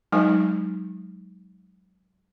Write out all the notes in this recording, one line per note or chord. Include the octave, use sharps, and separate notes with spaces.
F#3 G#3 D#4 G#5